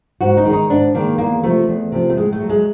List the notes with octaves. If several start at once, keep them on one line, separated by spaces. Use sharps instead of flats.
G#2 F#4
D#4
D#3 G#3
D#4
G#2 D4
D#3 G#3 A#3
E2 A#3
C3 F3 A3
E2
C3 F3
A3
A2 G#3
A3
F#3
G#3